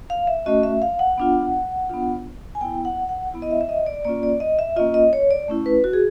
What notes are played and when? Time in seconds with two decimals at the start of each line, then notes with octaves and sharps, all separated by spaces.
0.10 F5
0.27 E5
0.46 A3 C#4 F#4 D#5
0.63 E5
0.82 F5
0.99 F#5
1.18 B3 D4 F4
1.90 B3 D4 F4
2.55 G#5
2.61 B3 E4 G5
2.85 F#5
3.09 F#5
3.34 B3 E4
3.42 D#5
3.51 E5
3.61 E5
3.69 D#5
3.86 D5
4.05 A#3 C#4 F4 D5
4.23 D5
4.40 D#5
4.59 E5
4.76 A#3 C#4 F4 D#5
4.94 D#5
5.13 C#5
5.31 D5
5.48 A3 C#4 E4
5.66 B4
5.84 F#4
5.93 G#4